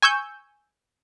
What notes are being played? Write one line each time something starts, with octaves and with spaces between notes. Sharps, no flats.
G#5 C#6 E6 G6